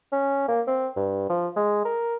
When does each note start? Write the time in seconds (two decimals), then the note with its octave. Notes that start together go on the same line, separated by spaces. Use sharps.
0.12 C#4
0.48 A#3
0.67 C4
0.97 G2
1.29 F3
1.56 G#3
1.85 A#4